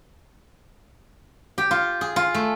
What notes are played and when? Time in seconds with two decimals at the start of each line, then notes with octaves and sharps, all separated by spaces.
1.58 G4
1.71 F4
2.01 G#4
2.16 F4
2.34 A3